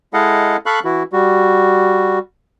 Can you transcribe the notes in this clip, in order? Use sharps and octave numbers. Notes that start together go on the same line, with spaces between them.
G#3 E4 A4 D#5 F5 F#5
A4 F5 B5 C#6 F#6
E3 E4 F#4
G3 F#4